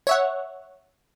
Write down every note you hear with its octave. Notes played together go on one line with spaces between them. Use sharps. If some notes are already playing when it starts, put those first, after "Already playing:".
C#5 E5 F#5